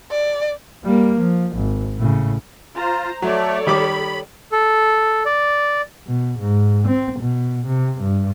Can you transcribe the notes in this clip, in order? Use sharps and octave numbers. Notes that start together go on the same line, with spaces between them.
D5
G3 A#3
F3
G#1
A2 C#3
F4 C5 A#5
F#3 A3 A4 C#5 D5
D#3 G3 B5 D6
A4
D5
B2
G#2
C4
B2
C3
G2